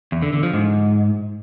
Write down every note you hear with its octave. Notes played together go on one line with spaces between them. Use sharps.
E2
D3
D3
F3
G#2